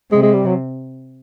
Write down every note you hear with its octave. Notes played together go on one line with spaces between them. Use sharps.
C3 G#3
G#3
G3
F#3